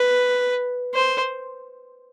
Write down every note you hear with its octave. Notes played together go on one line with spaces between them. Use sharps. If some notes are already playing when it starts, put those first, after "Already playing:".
Already playing: B4
C5